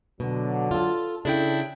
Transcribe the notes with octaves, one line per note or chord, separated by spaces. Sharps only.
B2 D3 F#3
F4 A4
C#3 D4 E4 A4 G5